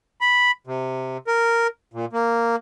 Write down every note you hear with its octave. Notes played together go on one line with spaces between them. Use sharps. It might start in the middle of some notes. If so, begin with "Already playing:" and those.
B5
C3
A#4
A#2
A#3